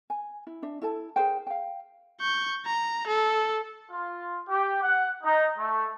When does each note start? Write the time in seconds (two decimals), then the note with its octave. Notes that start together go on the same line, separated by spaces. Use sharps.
0.10 G#5
0.47 E4
0.62 D4 E5
0.82 E4 A4 A5
1.16 G#4 A#4 C5 G5
1.47 F5 G5
2.21 C#6 G6
2.66 A#5
3.07 A4
3.91 F4
4.49 G4
4.82 F#5
5.23 D#4
5.58 A3